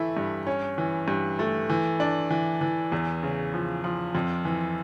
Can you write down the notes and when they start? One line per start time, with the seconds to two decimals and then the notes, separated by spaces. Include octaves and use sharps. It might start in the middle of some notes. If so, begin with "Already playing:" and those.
Already playing: E3 A3 E4
0.17 G2
0.47 C#4
0.78 E3
1.08 G2
1.39 A3
1.69 E3
2.00 D4
2.30 E3
2.61 E3
2.92 E2
3.23 C#3
3.54 F3
3.84 F3
4.15 F2
4.45 E3